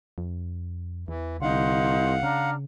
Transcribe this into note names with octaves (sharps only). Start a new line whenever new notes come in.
F2
E2 E3
C2 D3 D#4 F5 F#5 C6
C#3 D4 A#5 F6